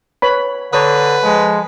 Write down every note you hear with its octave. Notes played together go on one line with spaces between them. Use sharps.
B4 C#5 B5
D3 B4 C#5 A#5 D#6
F3 G#3